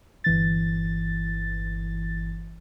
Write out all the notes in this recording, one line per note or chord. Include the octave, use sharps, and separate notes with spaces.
G1 E3 A6